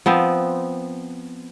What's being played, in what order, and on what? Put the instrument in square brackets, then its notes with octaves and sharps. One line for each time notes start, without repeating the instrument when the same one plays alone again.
[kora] F3 B3 C4